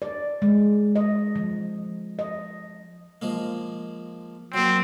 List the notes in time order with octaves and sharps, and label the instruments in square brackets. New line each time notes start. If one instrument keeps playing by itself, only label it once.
[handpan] D5
G#3
D#5
F3
D#5
[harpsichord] F3 G#3 A#3
[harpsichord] F#3 A#3 [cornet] C4